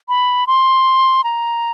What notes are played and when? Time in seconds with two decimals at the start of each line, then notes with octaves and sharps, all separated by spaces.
0.09 B5
0.47 C6
1.24 A#5